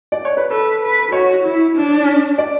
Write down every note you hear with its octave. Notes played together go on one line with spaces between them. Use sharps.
D5
C#5
B4
A4 B4
B4
F#4 C#5
E4
D4
D5